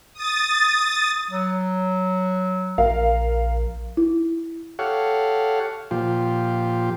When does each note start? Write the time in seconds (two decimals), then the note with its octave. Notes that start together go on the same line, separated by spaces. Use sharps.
0.13 D#6 A6
1.31 F#3
2.78 A#1 A#4 F5
3.97 E4
4.79 G4 A4 C#5 F5 F#5
5.91 A#2 F3 F4 G4